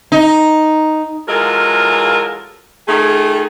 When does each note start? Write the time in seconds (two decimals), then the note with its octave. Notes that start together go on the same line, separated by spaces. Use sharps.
0.12 D#4
1.28 E3 F#3 G#3 F4 A4 A#4
2.88 D#3 A3 F4 G#4